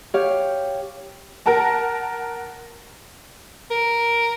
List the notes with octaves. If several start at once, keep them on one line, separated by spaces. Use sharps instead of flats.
G4 C#5 F5
A#4 F#5 A5 A#5
A#4